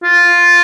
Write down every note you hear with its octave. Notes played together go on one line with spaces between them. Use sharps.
F4